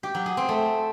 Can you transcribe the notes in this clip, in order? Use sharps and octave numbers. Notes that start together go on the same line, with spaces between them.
G4
F#3
G#4
C4
A3